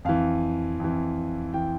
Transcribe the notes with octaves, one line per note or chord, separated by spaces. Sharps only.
F2 E3 F5
F2 E3
E3 G5